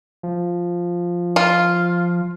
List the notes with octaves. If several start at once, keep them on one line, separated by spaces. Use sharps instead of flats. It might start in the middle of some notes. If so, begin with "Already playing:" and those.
F3
F4